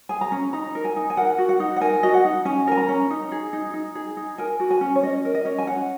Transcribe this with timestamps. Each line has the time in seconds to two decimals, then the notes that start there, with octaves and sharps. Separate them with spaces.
0.09 G#4 G#5
0.21 A#5
0.32 C#4
0.53 D#4 A#5
0.75 A#4
0.85 G#5
0.96 D#4
1.10 G#5
1.17 A#4 F#5
1.38 F#4
1.49 F#5
1.60 D#4
1.76 F#5
1.81 A#4 G#5
2.03 F#4 D#5
2.14 F#5
2.25 D#4
2.45 C#4 G#5
2.67 A#4 G#5
2.77 A#5
2.88 C#4
3.10 D#4
3.32 G#4
3.53 D#4
3.74 D#4
3.95 G#4
4.17 D#4
4.38 A#4 G#5
4.60 F#4
4.71 G#5
4.81 C#4
4.96 C#5
5.03 C#4 D#5
5.25 A#4
5.34 D#5
5.45 C#4
5.58 G#5
5.67 C#4 F#5